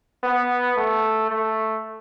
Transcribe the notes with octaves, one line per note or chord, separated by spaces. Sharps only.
B3
A3
A3